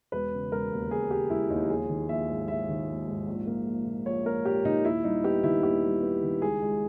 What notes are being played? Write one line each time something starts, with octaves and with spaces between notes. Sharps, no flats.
E1 B4
C#3
E1 A#4
D#2
E1 G#4
C#3 G4
E1 E4
D#2 D#4
A#1 G#4
D#3
A#1 E5
G#2
A#1 E5
D#3
A#1
G#2
A#1
A#3
A#1
A#2
A#1 C#5
A#3 A#4
A#1 G4
A#2 D#4
D#2 E4
G3 D#4
B3 G4
D#3 E4
D#2 G4
G3
B3
D#3
C#2 G#4
G#3